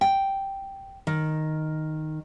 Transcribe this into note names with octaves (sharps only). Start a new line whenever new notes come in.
G5
D#3